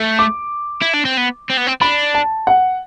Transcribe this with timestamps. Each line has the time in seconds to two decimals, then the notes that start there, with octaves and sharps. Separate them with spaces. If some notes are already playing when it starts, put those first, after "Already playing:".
Already playing: A3
0.19 D6
0.82 E4
0.94 D4
1.05 C4
1.17 B3
1.50 C4
1.57 B3
1.67 C4
1.81 D4 B5
2.15 A5
2.47 F#5